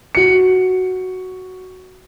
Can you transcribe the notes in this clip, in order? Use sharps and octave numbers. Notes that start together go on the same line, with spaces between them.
F#4 C#7